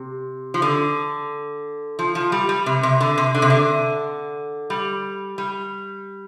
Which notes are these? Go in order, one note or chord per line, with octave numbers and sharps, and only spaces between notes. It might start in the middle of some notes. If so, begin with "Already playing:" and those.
Already playing: C3
F3
D3
F3
F3
G3
G3
C3
C3
D3
C3
D3
C3
D3
G3
G3